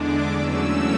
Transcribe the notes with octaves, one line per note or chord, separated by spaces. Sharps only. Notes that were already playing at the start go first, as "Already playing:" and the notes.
Already playing: E2 D3 G#3 D4 D6
E2 C#3 F#3 A3 C#4 E6